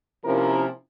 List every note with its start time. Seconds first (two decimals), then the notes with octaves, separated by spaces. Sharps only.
0.25 C3 F3 A#3 C#4 E4 A#4